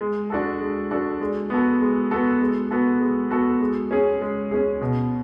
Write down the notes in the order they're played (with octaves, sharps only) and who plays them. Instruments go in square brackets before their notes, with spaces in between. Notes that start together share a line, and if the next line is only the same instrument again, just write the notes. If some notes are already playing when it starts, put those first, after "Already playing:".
[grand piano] G#3
D4 F#4 A4
G#3
D4 F#4 A4
G#3
B3 F#4 A4
G#3
B3 F#4 A4
G#3
B3 F#4 A4
G#3
B3 F#4 A4
G#3
C#4 G#4
G#3
C#4 G#4
B2